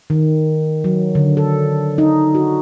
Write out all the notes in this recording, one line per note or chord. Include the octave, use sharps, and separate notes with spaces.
D#3
F#3
D3
A4
D#4
F#4